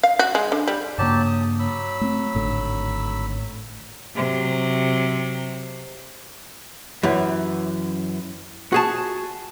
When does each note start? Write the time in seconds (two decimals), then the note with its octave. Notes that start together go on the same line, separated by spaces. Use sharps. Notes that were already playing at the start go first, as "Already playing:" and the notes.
0.03 F5
0.19 F#4
0.35 G#3
0.52 D3
0.68 G3
0.98 G2 C#3 F#3 A#3 G4 A5
1.26 D#6
1.59 F#3 B5 E6
2.01 A3 C4
2.35 G#1 A2 D3
4.15 C3 F#3
7.03 F#2 E3
8.72 F#4 G#4 A5